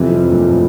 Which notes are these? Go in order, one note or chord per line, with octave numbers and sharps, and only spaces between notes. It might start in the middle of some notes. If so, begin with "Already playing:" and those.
Already playing: F2 C3 E3
E3 G3
G2 A#2
A2